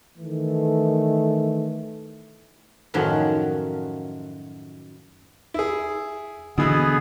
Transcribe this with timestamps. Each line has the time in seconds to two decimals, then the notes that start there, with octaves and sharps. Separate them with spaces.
0.17 D#3 E3 A3
2.94 F#2 A2 D#3 F3 F#3
5.54 E4 G#4
6.58 B2 D3 E3 B3 G#4